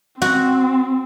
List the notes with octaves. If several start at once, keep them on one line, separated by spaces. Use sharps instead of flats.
C4 F#4